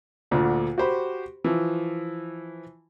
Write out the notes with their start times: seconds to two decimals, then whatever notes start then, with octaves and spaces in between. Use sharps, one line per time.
0.31 D2 A#2 D3
0.78 F#4 G4 C5 B5
1.44 E3 F3